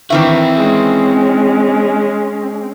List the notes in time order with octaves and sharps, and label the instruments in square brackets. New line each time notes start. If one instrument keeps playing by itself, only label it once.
[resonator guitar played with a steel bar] D#3 E3 E5 [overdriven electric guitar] C4 F#4
[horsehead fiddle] G#3 C#4